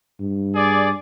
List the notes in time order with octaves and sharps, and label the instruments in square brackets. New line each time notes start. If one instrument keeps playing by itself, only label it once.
[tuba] G2
[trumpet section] G#4 D5